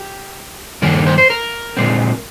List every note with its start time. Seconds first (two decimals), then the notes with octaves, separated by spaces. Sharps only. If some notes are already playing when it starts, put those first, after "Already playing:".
Already playing: G4
0.82 G2 D#3 A#3 A#4
1.06 C5
1.18 C5
1.30 A#4
1.77 A#2 G#3 C4